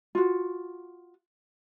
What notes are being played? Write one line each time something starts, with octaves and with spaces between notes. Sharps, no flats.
F4 F#4